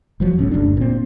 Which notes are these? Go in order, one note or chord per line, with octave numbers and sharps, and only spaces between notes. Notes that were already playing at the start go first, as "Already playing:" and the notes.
F1 F3 F#3
D#1 C2 A2 C#4
F#1 D2 G2 D4
A#2 C4